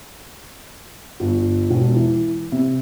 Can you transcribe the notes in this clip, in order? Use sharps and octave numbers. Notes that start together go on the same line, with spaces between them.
G1
E1
E3
C3